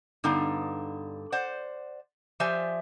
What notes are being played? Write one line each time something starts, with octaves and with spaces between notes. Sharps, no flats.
G2 D3 B3 D#4 F5
C5 D5 F#5
F3 G4 C5 D5 E5 G#5